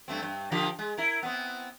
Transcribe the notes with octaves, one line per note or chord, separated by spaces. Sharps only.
G2 A3 C4
G2
D3 F3 G4
G#3
E4 A#4
B3 C4